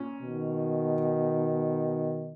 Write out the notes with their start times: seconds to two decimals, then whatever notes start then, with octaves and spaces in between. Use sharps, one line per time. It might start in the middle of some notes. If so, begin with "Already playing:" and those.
Already playing: A#2 C#4
0.20 B2 D#3